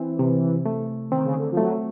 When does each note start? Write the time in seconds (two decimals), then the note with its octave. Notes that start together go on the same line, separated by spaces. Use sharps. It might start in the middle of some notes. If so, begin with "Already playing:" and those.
Already playing: E3 C4
0.19 C3
0.66 A3
1.11 D#3 C4
1.25 C#3
1.34 D3
1.52 F3
1.57 F#3 A3